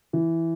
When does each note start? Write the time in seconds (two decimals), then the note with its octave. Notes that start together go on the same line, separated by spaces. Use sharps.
0.13 E3